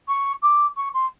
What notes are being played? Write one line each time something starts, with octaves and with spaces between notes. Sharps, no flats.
C#6
D6
C#6
C6